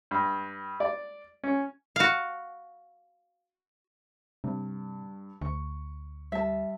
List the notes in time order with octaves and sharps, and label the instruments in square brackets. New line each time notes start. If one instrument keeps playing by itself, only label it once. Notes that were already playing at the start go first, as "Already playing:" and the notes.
[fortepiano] G2
D5
C#4
[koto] F#4 F5
[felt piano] G2 [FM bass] C3
[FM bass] D2 [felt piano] C#6
[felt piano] G3 [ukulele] E5 A5